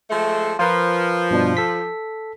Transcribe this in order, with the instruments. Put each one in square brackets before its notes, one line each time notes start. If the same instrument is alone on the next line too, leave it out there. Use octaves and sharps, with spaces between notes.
[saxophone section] F3 G#3 A3
[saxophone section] F3 [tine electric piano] F4 A#4 B4
[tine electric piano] G2 B2 D4
A4 B6